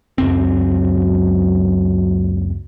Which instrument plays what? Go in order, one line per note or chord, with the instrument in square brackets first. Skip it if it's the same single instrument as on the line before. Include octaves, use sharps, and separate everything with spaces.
[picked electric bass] C#2 F#2 C4 [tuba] F#3